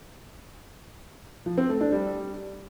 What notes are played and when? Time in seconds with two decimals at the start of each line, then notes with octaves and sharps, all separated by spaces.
1.46 F3
1.58 C4
1.69 A3
1.81 D4
1.92 G3